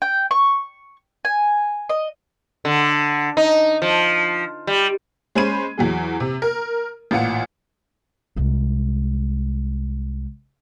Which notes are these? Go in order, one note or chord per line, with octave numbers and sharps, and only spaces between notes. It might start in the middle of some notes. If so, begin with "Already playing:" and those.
G5
C#6
G#5
D#5
D3
D#4
F3
G3
G#3 C#4 C5 B5 G#6 D#7
E2 F#3 G#4
C3
A#4
A1 A#2 F4 F#5 C#7
C2 G#3